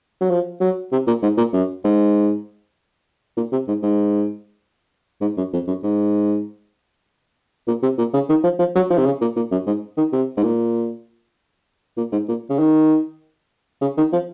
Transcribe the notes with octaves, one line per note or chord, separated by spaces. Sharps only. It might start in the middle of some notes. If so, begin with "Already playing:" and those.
F#3
F3
F#3
C3
A#2
G#2
A#2
F#2
G#2
A#2
C3
G#2
G#2
G#2
F#2
F2
F#2
G#2
A#2
C3
A#2
C#3
D#3
F3
F3
F#3
F3
C3
C#3
A#2
A#2
F#2
G#2
D#3
C3
G#2
A#2
A#2
G#2
A#2
C#3
D#3
C#3
D#3
F3